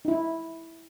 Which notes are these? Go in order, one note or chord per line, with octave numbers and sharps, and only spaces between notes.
D#4 E4